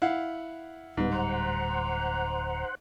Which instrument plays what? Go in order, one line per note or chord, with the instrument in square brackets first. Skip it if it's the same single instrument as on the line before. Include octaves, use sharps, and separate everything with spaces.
[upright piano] E4 F5 F#5
[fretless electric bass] D1 G3 [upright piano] G#2 [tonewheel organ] B3
[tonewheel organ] C5 F#5 [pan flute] A#5